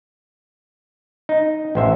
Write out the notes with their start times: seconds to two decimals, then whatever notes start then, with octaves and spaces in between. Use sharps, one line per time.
1.29 D#4
1.75 A1 C5 E5